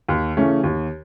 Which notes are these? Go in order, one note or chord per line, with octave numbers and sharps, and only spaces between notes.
D#2
C#3 E3 A3 C#4
D#2